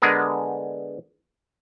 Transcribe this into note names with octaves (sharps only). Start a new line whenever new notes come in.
D3 G#3 B3 G#4 A#4